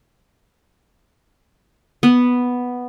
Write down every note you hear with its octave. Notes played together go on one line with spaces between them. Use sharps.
B3